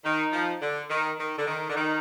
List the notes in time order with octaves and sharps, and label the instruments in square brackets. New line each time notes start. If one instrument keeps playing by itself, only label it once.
[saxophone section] D#3 [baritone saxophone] D#4
[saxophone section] F3
D3
D#3
D#3
D3
D#3
D3
[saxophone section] D#3 [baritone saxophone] D#4